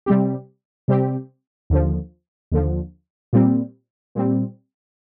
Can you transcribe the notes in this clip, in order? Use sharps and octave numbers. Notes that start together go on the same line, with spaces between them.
C3 G3 C4 G4
C3 G3 C4 G4
D#2 D3 F3
D#2 D3 F3
A#2 G3 C4
A#2 G3 C4